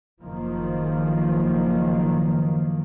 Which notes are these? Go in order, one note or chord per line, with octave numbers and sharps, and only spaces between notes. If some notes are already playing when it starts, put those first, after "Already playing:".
F#1 D#3 F3 A#3